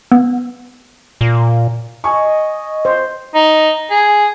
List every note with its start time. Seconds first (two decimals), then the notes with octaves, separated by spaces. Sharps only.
0.12 B3
1.21 A#2
2.04 D#5 G#5 C#6
2.85 C5
3.34 D#4
3.91 G#4